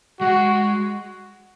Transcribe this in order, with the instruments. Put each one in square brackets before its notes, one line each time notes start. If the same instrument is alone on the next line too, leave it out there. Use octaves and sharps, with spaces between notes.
[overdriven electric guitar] G#3 [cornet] F#4